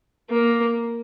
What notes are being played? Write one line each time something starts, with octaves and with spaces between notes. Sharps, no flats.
A#3